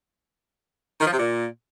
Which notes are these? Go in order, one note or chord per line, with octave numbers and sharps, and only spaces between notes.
D#3
F3
C3
A#2